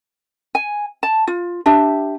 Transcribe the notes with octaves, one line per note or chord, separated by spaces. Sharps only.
G#5
A5
F4
D4 G4 E5